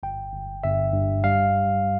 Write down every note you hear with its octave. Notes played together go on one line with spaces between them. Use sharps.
G1 G5
G1
G1 E5
G2
G3 F5